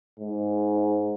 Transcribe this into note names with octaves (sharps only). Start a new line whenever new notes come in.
G#2